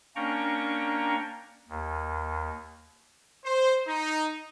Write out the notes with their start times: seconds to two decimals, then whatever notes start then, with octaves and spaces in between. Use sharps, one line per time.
0.16 A#3 C#4 D4 G5 A#5 C#6
1.69 D#2
3.45 C5
3.88 D#4